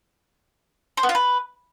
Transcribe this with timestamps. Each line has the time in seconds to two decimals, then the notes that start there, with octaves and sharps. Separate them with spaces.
0.97 C5
1.03 B3
1.09 F4
1.15 B4